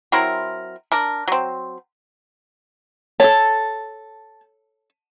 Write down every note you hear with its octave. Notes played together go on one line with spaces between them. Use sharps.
F#3 C4 E4 A#4
D4 A#4
F#3 C4
A4 C#5 A5